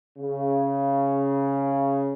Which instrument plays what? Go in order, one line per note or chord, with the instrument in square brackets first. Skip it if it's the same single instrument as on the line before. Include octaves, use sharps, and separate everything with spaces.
[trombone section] C#3